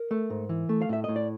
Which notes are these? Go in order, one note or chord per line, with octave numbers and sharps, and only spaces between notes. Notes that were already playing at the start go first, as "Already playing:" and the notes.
Already playing: A#4
A3
G#2
E3
A3
F5
A2 E5
A2 D#5
D5